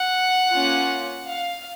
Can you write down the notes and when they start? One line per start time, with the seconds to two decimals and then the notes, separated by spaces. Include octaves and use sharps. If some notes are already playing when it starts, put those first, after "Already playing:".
Already playing: F#5
0.51 A#3 C#4 F4
1.27 F5